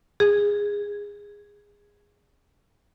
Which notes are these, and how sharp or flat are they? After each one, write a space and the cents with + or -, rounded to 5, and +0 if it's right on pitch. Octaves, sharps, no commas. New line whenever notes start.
G#4 -20